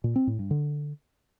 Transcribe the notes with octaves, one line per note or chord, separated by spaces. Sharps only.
A#2
C4
A2
G2
D3